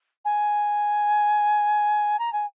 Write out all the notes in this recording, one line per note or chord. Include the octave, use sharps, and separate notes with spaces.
G#5
A#5
G#5